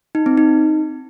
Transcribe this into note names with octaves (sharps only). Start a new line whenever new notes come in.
D#4
C4
D#4